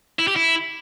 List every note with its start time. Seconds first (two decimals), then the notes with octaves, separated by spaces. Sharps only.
0.19 E4
0.27 G4
0.36 E4